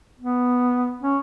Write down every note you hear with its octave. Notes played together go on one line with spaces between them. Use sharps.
B3
C#4